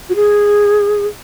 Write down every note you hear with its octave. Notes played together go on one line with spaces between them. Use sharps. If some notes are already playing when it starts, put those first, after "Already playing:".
F#4
G#4